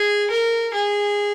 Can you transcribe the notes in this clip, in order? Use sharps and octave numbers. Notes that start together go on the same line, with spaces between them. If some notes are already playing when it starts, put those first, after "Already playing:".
Already playing: G#4
A#4
G#4